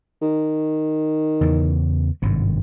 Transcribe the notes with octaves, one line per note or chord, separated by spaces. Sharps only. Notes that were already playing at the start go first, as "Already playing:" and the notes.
D#3
E2 C#3 E3
G#1 G2 C3